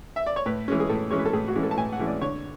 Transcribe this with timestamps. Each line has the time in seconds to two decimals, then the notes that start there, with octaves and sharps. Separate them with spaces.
0.16 E5
0.26 D5
0.36 C#5
0.46 A2 B4
0.68 E3 G#3 C#4
0.80 G#4
0.89 A2 A4
1.11 E3 G#3 C#4 C#5
1.19 B4
1.26 A4
1.33 A2 G#4
1.48 F#4
1.55 E3 G#3 C#4
1.63 A4
1.71 A5
1.77 A2 G#5
1.93 F#5
1.99 E3 G#3 C#4
2.07 D5
2.21 D3 C#5